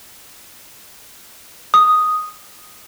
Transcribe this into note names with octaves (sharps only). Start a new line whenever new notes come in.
D#6